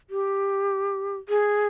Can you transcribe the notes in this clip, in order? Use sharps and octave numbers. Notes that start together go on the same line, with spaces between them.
G4
G#4